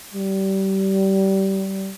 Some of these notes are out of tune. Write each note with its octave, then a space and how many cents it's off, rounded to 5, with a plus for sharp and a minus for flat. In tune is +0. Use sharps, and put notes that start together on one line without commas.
G3 -25